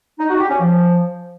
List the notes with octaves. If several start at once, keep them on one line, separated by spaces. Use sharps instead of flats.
D#4
F#4
G4
C#4
F3